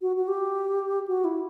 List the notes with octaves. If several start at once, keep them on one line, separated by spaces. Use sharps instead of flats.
F#4
F#4
G4
F#4
E4